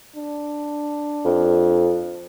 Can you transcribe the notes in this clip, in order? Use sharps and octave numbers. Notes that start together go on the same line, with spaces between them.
D4
F2